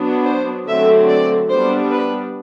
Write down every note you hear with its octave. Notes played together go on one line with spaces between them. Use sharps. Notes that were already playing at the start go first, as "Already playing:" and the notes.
Already playing: F#3 B3 D4
C5
D3 F#3 A3 C4 E5
D5
G3 B3 D4 C5
B4